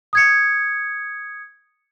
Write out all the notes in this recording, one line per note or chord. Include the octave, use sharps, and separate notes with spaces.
D#6 G#6 C#7